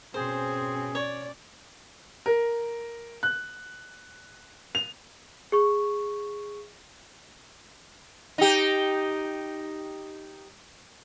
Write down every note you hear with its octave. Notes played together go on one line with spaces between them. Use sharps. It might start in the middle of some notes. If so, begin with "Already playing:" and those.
B2 C4 C#4 G#4 C5
C#5 D5
A#4
F#6
F7
G#4 C#6
D#4 G4